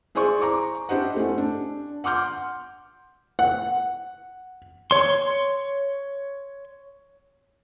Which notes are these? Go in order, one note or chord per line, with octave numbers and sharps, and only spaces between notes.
E4 G#4 C5 D5 C6 C#6
A#5 C#6 D6
D4 E4 G4 C5 D#5 F#5
A3 C#4
D4
F#5 C6 D6 F6 G6
F#5
C#5 C6